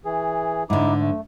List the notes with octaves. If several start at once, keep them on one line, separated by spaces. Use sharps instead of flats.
E3 G#4
G#2 D3 D#4 E4 D6
A3